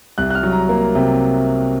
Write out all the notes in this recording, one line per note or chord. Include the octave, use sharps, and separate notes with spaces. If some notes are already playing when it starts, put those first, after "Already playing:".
C2 F#6
F#6
F6
F#3
A#5
A#3
C3